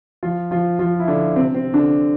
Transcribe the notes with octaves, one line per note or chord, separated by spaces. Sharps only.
F3 F4
F3 F4
F3 F4
E4
D3 D4
C3 C4
C3 C4
D3 D4